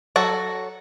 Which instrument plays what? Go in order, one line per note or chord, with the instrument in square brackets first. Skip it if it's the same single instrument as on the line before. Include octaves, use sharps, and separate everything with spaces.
[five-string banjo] F#3 F#4 A4